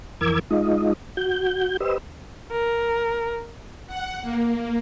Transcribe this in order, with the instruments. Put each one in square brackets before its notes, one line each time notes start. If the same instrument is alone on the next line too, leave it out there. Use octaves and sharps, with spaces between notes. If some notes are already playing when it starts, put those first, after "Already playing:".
[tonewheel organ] F2 E3 A#4 D6 E6 G#6
G#3 D#4 F4 D#5
F#4 G6
G4 B4 C5 D#5 E6
[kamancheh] A#4
[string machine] F#5
A#3